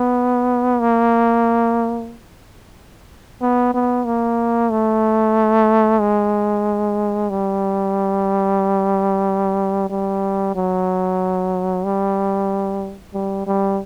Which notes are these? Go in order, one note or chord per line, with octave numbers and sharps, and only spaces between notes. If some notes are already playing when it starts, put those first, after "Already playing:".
Already playing: B3
A#3
B3
B3
A#3
A3
G#3
G3
G3
F#3
G3
G3
G3